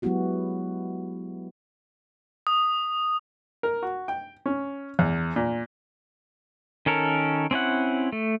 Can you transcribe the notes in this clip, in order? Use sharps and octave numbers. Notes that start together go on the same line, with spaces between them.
F#3 G#3 B3 E4 F#4 G4
D#6
A#4
F#4
G5
C#4
E2
A#2
D#3 C#4 A4 A#4
C4 C#4 E4 F#5
A3